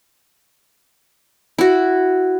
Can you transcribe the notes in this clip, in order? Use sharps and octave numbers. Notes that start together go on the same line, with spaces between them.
E4 F#4